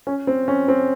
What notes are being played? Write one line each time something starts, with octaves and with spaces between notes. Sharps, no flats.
C#4
C4
C#4
C4